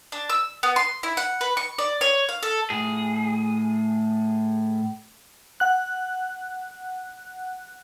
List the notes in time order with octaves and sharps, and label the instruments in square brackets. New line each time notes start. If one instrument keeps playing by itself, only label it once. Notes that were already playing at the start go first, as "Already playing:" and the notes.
[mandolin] D4
E6
B3
C6
E4
F#5
B4
C#6
D5
C#5
F5
A4
[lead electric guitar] A2 G#4
[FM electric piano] F#5 F#6